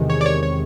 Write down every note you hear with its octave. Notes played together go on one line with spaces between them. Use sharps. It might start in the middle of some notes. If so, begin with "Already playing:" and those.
Already playing: E2 C3 D#3 G#3
C#5
D5
C#5
C#5